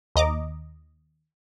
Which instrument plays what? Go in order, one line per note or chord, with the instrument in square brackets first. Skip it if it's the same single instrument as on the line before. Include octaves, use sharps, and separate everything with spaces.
[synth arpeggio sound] D#2 D#5 A#5 D6